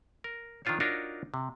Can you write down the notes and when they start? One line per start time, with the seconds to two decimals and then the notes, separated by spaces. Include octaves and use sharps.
0.24 A#4
0.65 D#3 F3 D4 F4 C5 C#5
0.80 D4 D#4 F4 F#4 A#4 C#5
1.34 C3